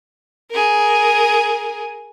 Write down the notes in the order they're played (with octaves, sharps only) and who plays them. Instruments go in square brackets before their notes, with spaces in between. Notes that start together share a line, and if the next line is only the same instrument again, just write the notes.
[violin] G#4 A#4